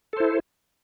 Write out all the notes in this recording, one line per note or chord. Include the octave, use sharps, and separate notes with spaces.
E4 A4 C5